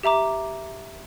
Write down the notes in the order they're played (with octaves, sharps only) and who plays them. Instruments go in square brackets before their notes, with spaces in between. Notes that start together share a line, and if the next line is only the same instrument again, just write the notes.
[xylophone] G4 E5 A#5 D6